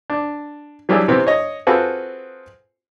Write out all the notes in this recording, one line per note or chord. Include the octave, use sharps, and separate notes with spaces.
D4
E3 F#3 G3 D4 E4 G#4
C3 E3 B3 C4
C#5 D#5
C4 F4 F#4 G#4 A4 B4